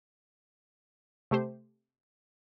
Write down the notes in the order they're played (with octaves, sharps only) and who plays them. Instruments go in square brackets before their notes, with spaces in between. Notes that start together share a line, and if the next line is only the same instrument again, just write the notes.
[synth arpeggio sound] C3 A3 G4 C5